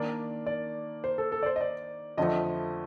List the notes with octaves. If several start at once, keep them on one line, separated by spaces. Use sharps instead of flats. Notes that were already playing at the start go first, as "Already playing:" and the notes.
Already playing: D#3 A#3 D4 D5
D5
C5
A4
A4
D5
C5
D#5
D5
F2 D3 F3 A3 D#5